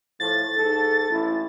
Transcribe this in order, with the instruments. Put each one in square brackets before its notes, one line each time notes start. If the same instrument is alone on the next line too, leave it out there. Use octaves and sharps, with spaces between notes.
[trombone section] A2 F3 A3 [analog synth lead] A6
[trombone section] G#2 A4
A1 E4